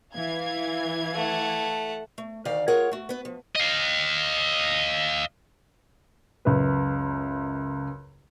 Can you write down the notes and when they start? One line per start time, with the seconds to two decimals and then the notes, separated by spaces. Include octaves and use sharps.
0.14 E3 F5 G#6
1.14 A3 F#5
2.18 A3
2.45 D2 D#3 D5 F5 G5
2.68 A3 F4 G#4 A#4 C#5 F#5
2.92 A3 F#4
3.09 B3 B4
3.25 F3
3.56 D#5 F5
6.45 C#2 F#2 B4